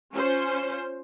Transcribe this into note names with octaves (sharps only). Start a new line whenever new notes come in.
C#4 F4 C5